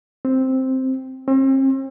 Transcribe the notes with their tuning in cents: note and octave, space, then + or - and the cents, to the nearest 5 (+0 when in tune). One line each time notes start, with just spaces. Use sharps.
C4 +0
C4 +40